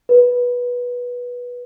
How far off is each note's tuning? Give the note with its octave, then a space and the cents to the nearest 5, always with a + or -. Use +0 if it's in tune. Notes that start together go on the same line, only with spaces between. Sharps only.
B4 -15